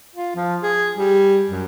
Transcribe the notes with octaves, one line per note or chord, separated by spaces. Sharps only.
F4
F3
G#4
G3
F#2